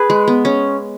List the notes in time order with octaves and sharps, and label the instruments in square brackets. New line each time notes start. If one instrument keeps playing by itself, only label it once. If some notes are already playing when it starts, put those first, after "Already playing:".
Already playing: [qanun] G#4 [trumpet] B4
[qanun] G#3
B3
C#4